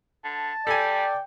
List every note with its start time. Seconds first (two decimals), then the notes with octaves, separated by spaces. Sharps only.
0.25 D3 A5
0.67 G3 A4 D5 G5 G#5